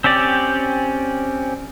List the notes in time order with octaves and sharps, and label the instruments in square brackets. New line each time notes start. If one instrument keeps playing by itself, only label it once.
[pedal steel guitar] C4 C#4 G4 D5